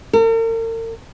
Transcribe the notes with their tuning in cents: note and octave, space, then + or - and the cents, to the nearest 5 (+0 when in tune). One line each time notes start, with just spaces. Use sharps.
A#4 -45